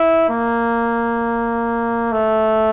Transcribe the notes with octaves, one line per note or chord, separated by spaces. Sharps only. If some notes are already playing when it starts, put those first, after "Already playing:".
Already playing: E4
A#3
A3